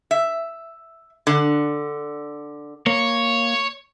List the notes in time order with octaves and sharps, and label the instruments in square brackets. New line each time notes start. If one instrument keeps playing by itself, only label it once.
[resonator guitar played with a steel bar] E5
D3
[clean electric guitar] A#3 [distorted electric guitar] C#5